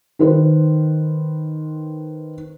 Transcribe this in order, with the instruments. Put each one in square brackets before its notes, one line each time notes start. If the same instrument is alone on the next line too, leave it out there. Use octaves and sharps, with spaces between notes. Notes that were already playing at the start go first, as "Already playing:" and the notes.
[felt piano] D#3 B4 C5